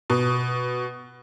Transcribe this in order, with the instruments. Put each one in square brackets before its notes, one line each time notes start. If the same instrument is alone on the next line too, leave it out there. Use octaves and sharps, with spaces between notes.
[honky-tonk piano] B2